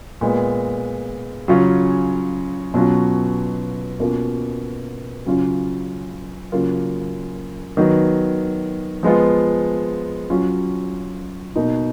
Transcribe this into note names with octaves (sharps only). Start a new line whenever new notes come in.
A#2 G#3 B3
C#3 F#3 C#4 F4
B2 F#3 C#4 F4
B2 A#3 C#4 F4
C#3 F#3 C#4 F4
C#3 F#3 A#3 F4
D#3 F#3 B3
F3 G#3 B3 F4
F#3 C#4 F4
B2 A#3 D#4